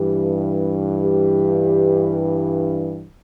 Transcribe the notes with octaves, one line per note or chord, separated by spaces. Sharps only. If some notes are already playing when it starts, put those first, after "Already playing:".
Already playing: G2 E3 G4
G4